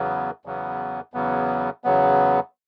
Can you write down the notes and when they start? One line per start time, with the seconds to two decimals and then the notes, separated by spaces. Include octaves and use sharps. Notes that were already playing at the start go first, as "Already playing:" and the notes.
Already playing: E2 C#3 F#3 B3
0.45 E2 C#3 F#3 B3
1.14 E2 C#3 F#3 B3
1.84 E2 C#3 F#3 B3